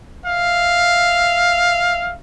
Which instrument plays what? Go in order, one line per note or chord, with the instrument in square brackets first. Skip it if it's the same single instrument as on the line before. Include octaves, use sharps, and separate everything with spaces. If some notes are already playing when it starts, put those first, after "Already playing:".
[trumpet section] E5 F5